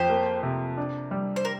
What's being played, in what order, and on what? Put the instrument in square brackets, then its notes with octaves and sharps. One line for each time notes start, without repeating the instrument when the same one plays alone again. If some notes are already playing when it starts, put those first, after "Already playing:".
Already playing: [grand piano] F2 [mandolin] G4 C5
[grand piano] A#3
C3
D4
G3
[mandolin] C5
A#4